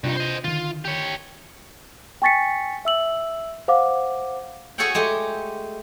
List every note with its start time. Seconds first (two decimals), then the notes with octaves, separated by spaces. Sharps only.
0.04 G2 C3 D4 D#4 F4
0.17 C5 D#5
0.44 D3 D#3 F4
0.85 G4 C#5
2.22 G5 G#5 C#6 A6 B6 C#7
2.85 E5 E6 F#7
3.68 C5 F5 F#5 D6
4.78 F#4 G#4 A4 C#5 F#5 G5
4.95 G#3 A3 G4